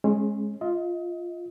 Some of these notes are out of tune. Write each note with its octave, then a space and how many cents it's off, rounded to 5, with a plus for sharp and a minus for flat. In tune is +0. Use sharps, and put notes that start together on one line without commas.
G#3 +5 C#4 -30
F4 +0 D#5 +30